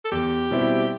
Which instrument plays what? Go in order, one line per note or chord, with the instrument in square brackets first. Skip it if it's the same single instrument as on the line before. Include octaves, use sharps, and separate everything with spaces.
[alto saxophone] A4
[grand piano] E2 [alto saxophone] G4
[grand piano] B2 G3 C4 E4